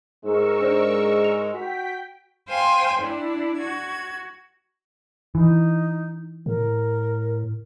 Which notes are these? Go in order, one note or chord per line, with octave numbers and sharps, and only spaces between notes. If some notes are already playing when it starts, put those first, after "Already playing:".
G#2 G#3 A#4 C#6 E6
D4 C5 D5
F7
F#4 G5 B6
C5 F5 G5 G#5 C6
D4 E4
F#4 G#6
E3 D#4
A2 A#4